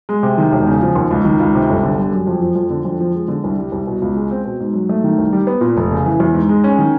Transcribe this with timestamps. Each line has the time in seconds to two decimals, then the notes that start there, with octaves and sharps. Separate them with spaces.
0.09 G#3
0.23 C3
0.38 D#3
0.52 E1
0.67 C#3
0.82 F3
0.95 D#2
1.11 C#2
1.25 D#3
1.40 C#2
1.55 C3
1.69 G1
1.84 D3
1.98 G3
2.12 F#2
2.27 F2
2.42 F3
2.56 F2
2.70 D3
2.85 F2
3.00 F3
3.15 G#3
3.28 D3
3.44 C2
3.58 G3
3.72 C2
3.87 B2
4.02 C#2
4.16 G#3
4.31 C4
4.45 B2
4.60 G#2
4.74 F#3
4.89 A3
5.04 D#3
5.18 C2
5.32 G3
5.47 B3
5.61 A#2
5.77 F1
5.91 C#3
6.06 E3
6.20 E2
6.34 G#2
6.49 G#3
6.64 C#4
6.79 D#3